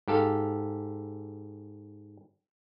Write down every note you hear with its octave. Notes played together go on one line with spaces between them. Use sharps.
G#2 G4 A4 F5